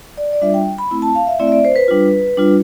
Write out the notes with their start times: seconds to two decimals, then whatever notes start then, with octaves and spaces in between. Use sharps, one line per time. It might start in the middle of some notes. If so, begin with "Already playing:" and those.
0.17 D5
0.33 D5
0.41 G3 D4 F4 E5
0.54 G5
0.79 B5
0.91 A3 C4 E4
1.02 A5
1.15 F5
1.27 E5
1.40 A3 C4 E4 D5
1.47 E5
1.52 D5
1.65 C5
1.76 B4
1.88 G3 D4 F4
2.37 G3 D4 F4